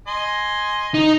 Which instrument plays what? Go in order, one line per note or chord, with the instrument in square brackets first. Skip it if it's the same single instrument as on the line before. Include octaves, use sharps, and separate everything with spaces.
[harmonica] D#5 G#5 C6
[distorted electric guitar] D#4